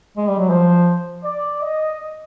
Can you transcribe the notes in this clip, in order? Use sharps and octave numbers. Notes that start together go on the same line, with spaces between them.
G#3
G3
F#3
F3 C5
D5
D#5